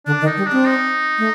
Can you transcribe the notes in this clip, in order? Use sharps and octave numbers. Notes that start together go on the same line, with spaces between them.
D3 D4
D#3
D#4
G3
D4
C4
D#4
A3